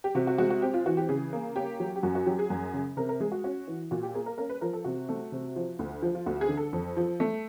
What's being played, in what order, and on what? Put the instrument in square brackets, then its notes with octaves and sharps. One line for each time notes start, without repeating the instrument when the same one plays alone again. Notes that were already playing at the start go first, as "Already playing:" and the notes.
[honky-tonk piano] G4
C3 F#4
F#4
G#3 F#4
F#4
C4 G4
F4
E3 F#4
G4
C#3 G#4
A#3
C#4 G4
F#3
G4
F#2 F#4
F#4
F#3 G4
G#4
F#2
C#3
C3 A#4
A#4
G#3 G#4
F#4
C#4 F#4
E3
A#2 F#4
G4
A#3 G#4
A#4
C#4 A#4
B4
F3 A#4
A4
C3 F#4
A3
C3
F3
D2
F3
F4
D2 F#4
G#4
D3
A4
F2
F3
A3